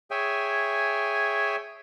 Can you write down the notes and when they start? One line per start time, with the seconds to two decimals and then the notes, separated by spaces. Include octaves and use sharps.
0.11 G#4 C#5 E5 G5 G#5